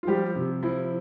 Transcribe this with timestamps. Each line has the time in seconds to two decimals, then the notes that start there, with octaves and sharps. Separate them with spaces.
0.03 F4
0.07 F3 G3 G4
0.35 C3
0.63 F3 E4